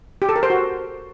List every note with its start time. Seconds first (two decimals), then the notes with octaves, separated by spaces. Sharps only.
0.22 G4
0.29 A4
0.36 A#4
0.43 C5
0.50 F#4